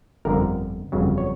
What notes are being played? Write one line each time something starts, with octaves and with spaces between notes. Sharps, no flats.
G1 F2 D3 F3 A#4
G1 F2 C#3 F#3
C#5